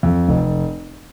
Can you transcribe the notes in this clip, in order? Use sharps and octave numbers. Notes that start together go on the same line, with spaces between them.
F2
F1